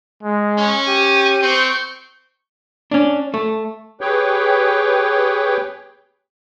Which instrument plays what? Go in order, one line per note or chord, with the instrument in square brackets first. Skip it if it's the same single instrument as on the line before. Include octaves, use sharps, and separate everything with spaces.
[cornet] G#3
[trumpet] C#4
[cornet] G4 [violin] D#7
[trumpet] C4 [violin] C#6 G6
[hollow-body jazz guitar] C#4 D4
A3
[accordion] G4 G#4 B4 C#5 G5